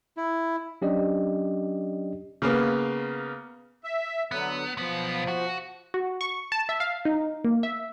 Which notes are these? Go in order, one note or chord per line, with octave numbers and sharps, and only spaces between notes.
E4
F#3 C#4 D4 G4 D5 D#5
C#3 A#3 B3
E5
D3 F#3 B3
B1 F3 B3
F#4
F#4
C#6
A5
E5
F5
D#4
A#3
E5